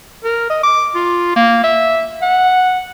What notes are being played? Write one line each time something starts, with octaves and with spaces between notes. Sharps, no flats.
A#4
D#5
D6
F4
A#3
E5
F#5